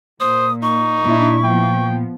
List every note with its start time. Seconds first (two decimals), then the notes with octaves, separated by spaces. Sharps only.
0.20 A#2 C5 D#6
0.62 D#4 C#6
1.04 A#2 D4 E4
1.44 F3 B3 G5